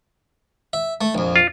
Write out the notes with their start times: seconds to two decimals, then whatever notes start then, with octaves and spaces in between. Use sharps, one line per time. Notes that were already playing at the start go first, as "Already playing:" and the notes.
0.73 E5
1.01 A3
1.15 A#1 F2
1.36 F4